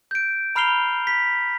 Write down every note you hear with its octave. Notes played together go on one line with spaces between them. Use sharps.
G6 D7
A#5 B5 F6 C7 F7 G7
B6